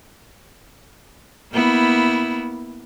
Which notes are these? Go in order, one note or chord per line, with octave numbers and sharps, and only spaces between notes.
A#3 B3 E4